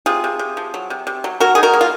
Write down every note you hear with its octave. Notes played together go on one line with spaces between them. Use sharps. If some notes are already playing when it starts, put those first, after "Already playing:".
C3 F4 G#4
C3
C3
F3
F#3
C3
C3
F#3
F#3 F#4 A#4
D#3 G#4
F#4 A#4
A#3
F4